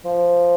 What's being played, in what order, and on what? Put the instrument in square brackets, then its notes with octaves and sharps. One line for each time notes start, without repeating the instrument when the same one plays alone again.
[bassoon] F3